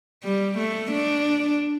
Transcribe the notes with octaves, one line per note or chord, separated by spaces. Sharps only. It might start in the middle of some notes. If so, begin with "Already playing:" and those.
G3
A3
D4